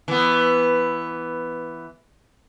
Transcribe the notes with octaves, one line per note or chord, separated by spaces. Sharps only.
E3 B3